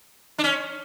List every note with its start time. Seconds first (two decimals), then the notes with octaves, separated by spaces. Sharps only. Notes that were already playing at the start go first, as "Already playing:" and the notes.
0.38 D4
0.44 C#4